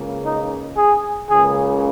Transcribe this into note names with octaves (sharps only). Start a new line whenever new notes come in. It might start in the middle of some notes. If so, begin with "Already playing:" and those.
Already playing: C#2 C#3 A#3
D#4
G#4
C#2 C#3 A#3 G#4